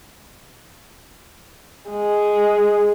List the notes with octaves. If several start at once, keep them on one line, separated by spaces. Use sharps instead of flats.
G#3